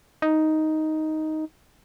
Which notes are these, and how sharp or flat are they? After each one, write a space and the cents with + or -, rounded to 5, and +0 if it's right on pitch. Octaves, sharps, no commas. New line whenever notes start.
D#4 +5